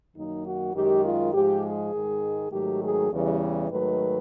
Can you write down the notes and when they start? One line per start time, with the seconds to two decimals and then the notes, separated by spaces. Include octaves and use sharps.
0.16 F#2 D#3 F#3 A#3 D#4
0.45 F#4
0.74 F#2 D#3 G#3 G4
1.04 F4
1.33 G#2 F3 G#3 G4
1.63 G#4
1.93 G#2 D#3 G#3
2.52 G#2 D#3 F#3 A3 G4
2.82 G#4
3.11 E2 C#3 E3 G3
3.70 G#2 D#3 F#3 A3 B4